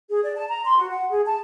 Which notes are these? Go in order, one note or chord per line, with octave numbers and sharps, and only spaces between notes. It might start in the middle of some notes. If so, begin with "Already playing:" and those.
G#4
D5
A5
A#5
C6
F#4
F#5
G#4
A5